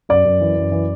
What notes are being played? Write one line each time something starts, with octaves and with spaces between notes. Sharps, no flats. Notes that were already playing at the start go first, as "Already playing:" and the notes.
F#2 D5
F#2
E3
F#2
E3